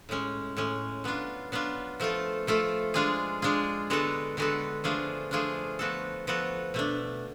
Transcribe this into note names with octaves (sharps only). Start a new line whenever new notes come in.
A2 G#3 C#4
A2 G#3 C#4
F#3 B3 D4 F4
F#3 B3 D4 F4
F3 A3 F4 A4
F3 A3 F4 A4
G#3 D4 F4 G#4
G#3 D4 F4 G#4
D3 G#3 B3 F#4 A4
D3 G#3 B3 F#4 A4
F3 A3 D4 F4 G#4
F3 A3 D4 F4 G#4
F3 B3 F#4 A4
F3 B3 F#4 A4
B2 A3 D4